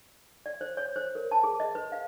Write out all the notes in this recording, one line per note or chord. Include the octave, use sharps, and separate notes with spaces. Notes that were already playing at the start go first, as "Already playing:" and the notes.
D5
C5
C#5
C5
A#4
A5
G#4
D#5
B4
F5